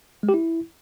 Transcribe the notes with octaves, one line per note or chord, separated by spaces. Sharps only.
G#3
G4
E4